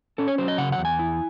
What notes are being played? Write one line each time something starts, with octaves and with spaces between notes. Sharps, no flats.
C#4 A4
C#5
F#3 C5
D#5
C#3 F#5
F#5
E2
G#5
E4